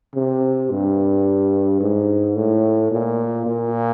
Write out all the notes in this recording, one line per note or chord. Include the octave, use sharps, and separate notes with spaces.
C3
G2
G#2
A2
A#2
A#2